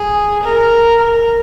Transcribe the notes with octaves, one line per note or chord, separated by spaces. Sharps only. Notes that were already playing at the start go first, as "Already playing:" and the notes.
Already playing: G#4
A#4
A#4